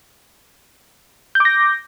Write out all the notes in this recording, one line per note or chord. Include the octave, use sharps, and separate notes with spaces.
D6 G6 A#6